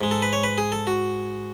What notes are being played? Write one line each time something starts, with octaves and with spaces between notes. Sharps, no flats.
G#2 G#3
A4
B4
C#5
B4
G#4
A4
F#4